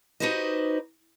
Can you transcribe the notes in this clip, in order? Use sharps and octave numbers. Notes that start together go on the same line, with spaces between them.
D#4 F#4 G4 B4 C5 D#5